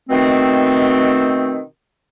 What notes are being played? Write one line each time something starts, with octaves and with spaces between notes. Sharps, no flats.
B2 D#3 A3 C4